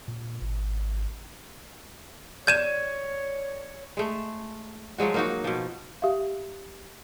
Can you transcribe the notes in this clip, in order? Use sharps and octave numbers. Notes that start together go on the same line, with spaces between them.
A#2
G#1
C#5 D5 G6 G#6 D#7 E7
G#3 A3
F3 F#3 G#3 F#4
A#3 D#4 F#4
B2 F3
G4 E5 F5